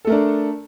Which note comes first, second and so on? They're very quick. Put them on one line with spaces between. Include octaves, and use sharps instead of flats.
A4 A3 A#4 D4